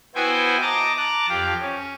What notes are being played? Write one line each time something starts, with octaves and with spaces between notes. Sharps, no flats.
B3 E4 F#4 C5 G5 G#5
D#5 A5 A#5 D6
A5 A#5 D6 F#6
F2 G4 F5
C#4